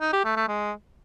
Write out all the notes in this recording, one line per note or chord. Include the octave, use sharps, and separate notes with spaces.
D#4
G4
A3
A3
G#3